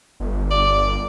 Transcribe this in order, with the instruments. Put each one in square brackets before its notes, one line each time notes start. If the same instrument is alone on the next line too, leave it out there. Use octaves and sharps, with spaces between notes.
[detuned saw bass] G1
[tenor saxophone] D5